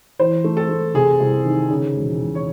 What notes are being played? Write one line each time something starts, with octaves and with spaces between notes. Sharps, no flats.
E3 C5
A3
A4
A3
C3 G#4
C2
D#3
C#3
E1
E1
C#5